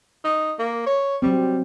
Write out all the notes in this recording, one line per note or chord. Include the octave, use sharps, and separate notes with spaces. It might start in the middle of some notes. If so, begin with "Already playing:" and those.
D#4
A#3
C#5
F#3 G3 C4